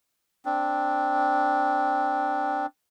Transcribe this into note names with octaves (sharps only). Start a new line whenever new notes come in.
C4 D4